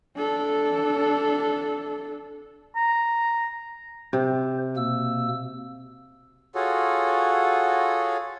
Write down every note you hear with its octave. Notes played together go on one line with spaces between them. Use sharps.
D4 A4
A#5
C3 C5
B2 A#3 E6
F4 F#4 G#4 A4 C#5